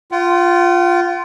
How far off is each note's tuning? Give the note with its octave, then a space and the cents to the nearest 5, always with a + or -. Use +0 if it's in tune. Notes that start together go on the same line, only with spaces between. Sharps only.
F4 +0 F#5 +45